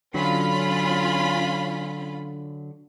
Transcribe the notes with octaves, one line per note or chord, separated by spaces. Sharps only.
D3 F#3 C#4 F4 B5